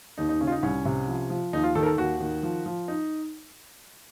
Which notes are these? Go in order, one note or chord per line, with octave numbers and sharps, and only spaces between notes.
D#2 D#4
D#4
C#3 C#4
F4
D#4
C2 C#4
C3
F3
F3
D#2 D#4
F4
D#3 A4
A#4
A4
D#2 F#4
D#3
F3
F3
D#4